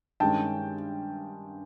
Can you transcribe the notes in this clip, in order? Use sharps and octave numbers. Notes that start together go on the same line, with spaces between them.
G2 D#3 G#3 C#4 G5 A5